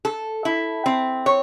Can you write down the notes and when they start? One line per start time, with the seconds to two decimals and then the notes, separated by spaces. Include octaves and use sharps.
0.05 A4
0.45 E4
0.86 C4
1.26 C#5